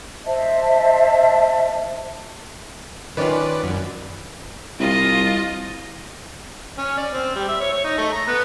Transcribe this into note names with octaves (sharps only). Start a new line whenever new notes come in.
C5 D#5 E5 A5
D#3 C#4 F4 B4 D5
F#2
C2 F4 D#5
C#4
D5
C4
G3
E5
C#5
C#5
D#4
A3
A#5
B3